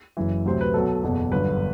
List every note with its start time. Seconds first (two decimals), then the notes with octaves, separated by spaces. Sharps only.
0.17 F#1 F#2 E3
0.46 D2 C3 F#3 C5
0.61 B4
0.74 B1 B2 F#3 A4
1.03 F#1 E2 B2 F#3
1.32 G1 F#2 D3 B4